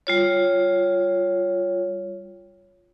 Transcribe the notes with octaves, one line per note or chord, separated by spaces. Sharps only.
G3 F4 C#5